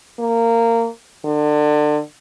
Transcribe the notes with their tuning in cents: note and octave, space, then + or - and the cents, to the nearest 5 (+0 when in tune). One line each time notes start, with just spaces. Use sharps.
A#3 -20
D3 +30